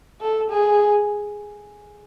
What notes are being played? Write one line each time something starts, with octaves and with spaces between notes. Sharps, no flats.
A4
G#4